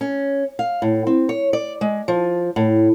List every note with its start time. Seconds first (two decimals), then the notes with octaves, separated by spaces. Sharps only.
0.01 C#4
0.59 F5
0.82 A2
1.07 C4
1.29 C#5
1.53 D5
1.81 G#3
2.08 F3
2.56 A2